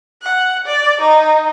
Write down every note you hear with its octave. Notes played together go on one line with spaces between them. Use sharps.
F#5
D5
D#4